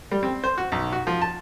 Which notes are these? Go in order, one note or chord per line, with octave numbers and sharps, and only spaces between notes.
G3
C4
C5
F#4
B1
F#4
F3
A5